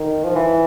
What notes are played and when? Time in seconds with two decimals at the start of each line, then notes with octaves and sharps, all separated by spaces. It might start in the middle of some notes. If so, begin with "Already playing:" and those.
Already playing: D#3
0.24 F3
0.36 E3